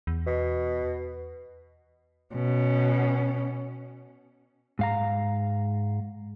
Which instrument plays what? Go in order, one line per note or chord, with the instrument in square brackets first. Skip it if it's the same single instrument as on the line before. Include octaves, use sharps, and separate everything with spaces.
[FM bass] E2
[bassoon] B2
[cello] B2 C#4
[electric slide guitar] G#2 F5 A#5